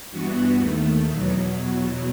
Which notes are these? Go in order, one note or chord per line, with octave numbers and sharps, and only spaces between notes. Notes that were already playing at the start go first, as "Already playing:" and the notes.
G2 E3 B3 F#4
D#2 D#3 A3
E2 B2 F#3